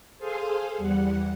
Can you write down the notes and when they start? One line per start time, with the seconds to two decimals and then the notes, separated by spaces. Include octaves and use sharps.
0.18 G#4 A4 C5 F5 G#5 C6
0.77 E2 G3 F#5